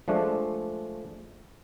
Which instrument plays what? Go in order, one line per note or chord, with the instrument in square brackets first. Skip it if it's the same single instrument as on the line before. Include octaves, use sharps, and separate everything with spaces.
[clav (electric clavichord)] F3 G#3 A3 D4